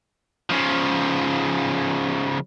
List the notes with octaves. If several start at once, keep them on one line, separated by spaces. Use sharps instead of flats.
C#3 F3